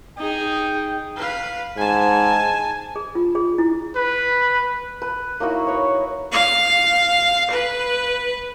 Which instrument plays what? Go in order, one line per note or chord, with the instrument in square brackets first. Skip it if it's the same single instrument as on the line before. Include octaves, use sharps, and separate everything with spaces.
[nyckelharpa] D#4 G#4 [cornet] G5
[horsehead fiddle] B4 F5
[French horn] G#2 [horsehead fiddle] G#5 A5
[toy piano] G#4
F4
G#4
E4
[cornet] B4
[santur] B4
A#3 D#4 E4 F#4
B4 C#5
[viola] F5
B4